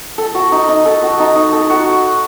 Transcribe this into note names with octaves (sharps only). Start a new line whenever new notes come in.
A4
F#4
D#4
D#4
A4
F#4
D#4
D#4
A4
F#4